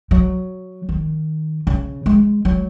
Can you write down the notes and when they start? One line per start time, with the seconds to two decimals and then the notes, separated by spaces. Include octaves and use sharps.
0.11 F#3
0.89 D#3
1.67 C#3
2.06 G#3
2.45 F#3